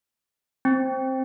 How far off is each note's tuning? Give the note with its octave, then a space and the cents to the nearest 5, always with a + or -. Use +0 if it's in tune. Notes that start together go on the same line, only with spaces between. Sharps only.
C4 +5